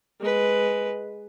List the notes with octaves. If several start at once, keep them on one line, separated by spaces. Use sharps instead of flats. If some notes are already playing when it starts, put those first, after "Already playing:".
G#3 B4